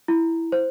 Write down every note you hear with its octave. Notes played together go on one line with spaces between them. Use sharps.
E4
C5